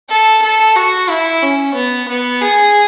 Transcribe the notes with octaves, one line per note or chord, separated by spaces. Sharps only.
A4
A4
F#4
E4
C#4
B3
B3
G#4